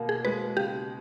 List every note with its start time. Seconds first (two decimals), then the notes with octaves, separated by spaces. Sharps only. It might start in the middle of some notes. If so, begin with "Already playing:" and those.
Already playing: B2 A#3
0.09 G#4
0.25 G#3 B4
0.57 C#3 G4